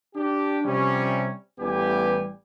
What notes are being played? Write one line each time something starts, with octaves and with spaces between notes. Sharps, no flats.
D4 G4
C3 F3 G3 C#4
A1 E3 G3 B3 G4 G#5